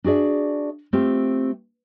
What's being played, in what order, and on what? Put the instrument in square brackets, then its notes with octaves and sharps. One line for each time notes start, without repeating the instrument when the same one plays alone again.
[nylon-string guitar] D4 F#4 G#4 D5 E5
A3 C4 F4 G4